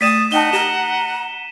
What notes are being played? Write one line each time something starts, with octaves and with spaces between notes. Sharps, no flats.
A3 D5 G5 D#6 A6 B6 D#7 E7
D#4 D#5 F#5 G5 A5 G7
G4 A#5 E7